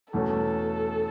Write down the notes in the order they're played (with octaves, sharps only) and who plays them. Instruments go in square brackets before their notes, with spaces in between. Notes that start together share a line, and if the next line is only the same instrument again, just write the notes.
[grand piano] E2 B2 A3 C#4 [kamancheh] A4